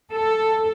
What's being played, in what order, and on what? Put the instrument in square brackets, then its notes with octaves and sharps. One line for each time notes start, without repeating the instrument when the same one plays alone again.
[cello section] A4